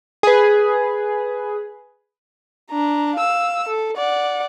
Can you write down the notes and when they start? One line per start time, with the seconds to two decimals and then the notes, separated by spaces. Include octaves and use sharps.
0.23 G#4 B4
2.71 D4 A#5
3.16 F5 E6
3.68 A4
3.97 D5 F#5